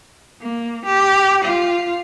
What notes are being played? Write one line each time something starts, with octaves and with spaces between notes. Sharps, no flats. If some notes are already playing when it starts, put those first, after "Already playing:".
A#3
G4
F4